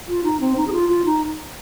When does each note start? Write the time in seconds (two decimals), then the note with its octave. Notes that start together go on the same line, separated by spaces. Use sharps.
0.08 F4
0.24 D#4
0.40 C4
0.56 D#4
0.67 G#4
0.73 F4
0.89 F4
1.05 D#4